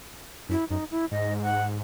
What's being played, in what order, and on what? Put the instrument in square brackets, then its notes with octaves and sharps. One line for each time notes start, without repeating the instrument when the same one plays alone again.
[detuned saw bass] F#2 [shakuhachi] E4
[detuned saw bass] F#2 [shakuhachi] D#4
[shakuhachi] E4
[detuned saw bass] G#2 [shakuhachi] D#5
[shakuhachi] F#5